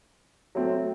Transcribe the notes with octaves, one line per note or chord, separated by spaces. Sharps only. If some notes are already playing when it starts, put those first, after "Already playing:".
F#3 A3 C4